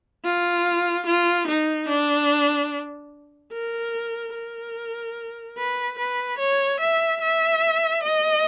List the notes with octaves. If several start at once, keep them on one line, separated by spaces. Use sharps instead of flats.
F4
F4
D#4
D4
A#4
A#4
B4
B4
C#5
E5
E5
D#5